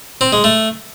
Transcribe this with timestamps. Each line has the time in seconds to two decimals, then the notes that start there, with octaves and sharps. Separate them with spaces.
0.21 C4
0.33 G#3
0.44 A3